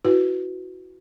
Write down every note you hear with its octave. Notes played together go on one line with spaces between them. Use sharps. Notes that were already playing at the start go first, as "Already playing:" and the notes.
E4 F#4 B4